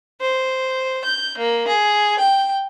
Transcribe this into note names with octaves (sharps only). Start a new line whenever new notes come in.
C5
G6
A#3
G#4
G5